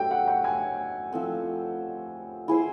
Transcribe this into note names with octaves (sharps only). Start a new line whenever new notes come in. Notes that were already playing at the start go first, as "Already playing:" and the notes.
Already playing: F#3 A3 D4 G4 G5
F#5
G5
G#5
F3 A3 C4
E4 G#4 C5